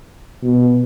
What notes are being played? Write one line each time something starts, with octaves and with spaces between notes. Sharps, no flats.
B2